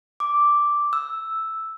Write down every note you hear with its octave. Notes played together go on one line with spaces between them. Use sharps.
D6
E6